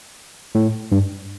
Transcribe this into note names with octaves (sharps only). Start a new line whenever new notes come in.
A2
G2